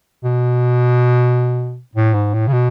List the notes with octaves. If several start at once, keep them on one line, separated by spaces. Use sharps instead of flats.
B2
A2
G#2
A2
C#3
B2